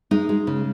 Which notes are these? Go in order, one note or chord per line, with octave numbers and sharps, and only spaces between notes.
G#3 D#4
G#3
C#3